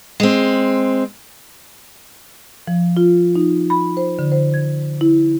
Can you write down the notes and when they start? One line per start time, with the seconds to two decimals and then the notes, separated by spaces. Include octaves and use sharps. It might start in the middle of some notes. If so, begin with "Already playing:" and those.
0.20 G#3 C4
2.68 F3
2.97 F4
3.36 D#4
3.70 B5
3.97 C5
4.19 D3
4.32 C5
4.54 G#6
5.01 E4